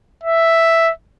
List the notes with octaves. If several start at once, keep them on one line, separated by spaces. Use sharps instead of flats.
E5